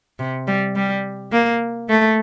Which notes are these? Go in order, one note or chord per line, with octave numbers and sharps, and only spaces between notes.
C3
G3
G3
A#3
A3